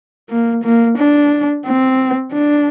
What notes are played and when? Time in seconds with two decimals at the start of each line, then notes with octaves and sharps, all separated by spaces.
0.30 A#3
0.64 A#3
0.98 D4
1.66 C4
2.33 D4